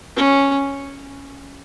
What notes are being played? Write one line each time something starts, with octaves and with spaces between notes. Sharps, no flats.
C#4